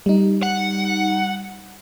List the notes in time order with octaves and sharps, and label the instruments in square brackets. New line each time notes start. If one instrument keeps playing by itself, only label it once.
[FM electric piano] G3 D#4
[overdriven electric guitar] F#5